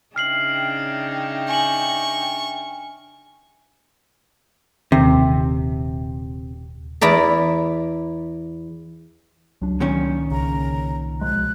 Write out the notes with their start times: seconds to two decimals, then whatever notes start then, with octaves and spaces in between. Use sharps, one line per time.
0.16 C#3 D4 D#4 E5 G5 F6 C7 F#7
1.49 G#5 C#6 F#7
4.92 D#1 C3 D#3
7.01 E2 E4 D5 A#5
9.62 C#2 F#3 D4
9.80 A#2 D#3 C#4
10.31 C2 C#3 A#5
11.21 B2 F3 G#3 F#6